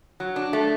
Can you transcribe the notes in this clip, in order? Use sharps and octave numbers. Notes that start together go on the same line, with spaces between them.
F#3
D4
A3